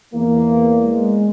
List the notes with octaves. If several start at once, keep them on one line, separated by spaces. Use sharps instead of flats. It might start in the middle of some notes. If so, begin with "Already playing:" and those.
E2 A#3
G#3